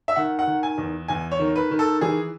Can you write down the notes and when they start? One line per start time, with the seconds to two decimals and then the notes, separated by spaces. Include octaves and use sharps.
0.08 E5
0.16 D#3 F#5
0.39 F#5
0.47 D#3
0.63 G#5
0.78 E2
1.08 E2 G#5
1.31 C#5
1.39 D#3
1.56 B4
1.71 D#3
1.79 A4
2.01 E3 G#4